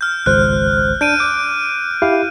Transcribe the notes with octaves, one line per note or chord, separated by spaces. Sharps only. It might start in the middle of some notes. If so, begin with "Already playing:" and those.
F6 G6
G#1 C#2 C5 F#6
D4 G6 D7 D#7
D6
E4 G4 F5